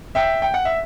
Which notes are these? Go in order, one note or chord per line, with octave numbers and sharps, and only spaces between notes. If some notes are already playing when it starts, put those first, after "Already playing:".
E5 G5
G5
F#5
E5